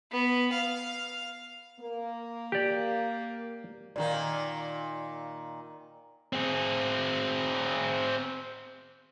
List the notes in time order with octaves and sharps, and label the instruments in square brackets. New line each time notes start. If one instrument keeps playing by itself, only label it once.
[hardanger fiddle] B3
F5
[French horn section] A#3
[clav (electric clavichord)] G4 D5
[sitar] A#2 D#3 A#3 [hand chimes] D5
[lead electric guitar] C4 G#4